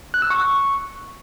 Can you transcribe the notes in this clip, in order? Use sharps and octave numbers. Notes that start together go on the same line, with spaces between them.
F#6
E6
C#6